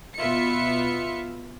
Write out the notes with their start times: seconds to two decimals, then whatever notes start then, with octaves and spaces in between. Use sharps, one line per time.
0.16 B2 B3 F4 E5 C#7